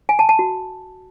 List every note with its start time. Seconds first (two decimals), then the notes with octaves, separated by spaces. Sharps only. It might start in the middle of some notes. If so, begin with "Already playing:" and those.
0.09 G#5
0.19 A5
0.29 A5
0.39 F#4